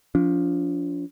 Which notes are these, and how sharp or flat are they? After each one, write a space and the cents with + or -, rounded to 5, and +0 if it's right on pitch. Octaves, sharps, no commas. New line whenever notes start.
F3 +0 D4 -40